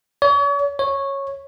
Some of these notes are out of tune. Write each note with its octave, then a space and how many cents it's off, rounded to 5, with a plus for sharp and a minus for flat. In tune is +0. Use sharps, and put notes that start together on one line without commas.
C#5 +40
C#5 -10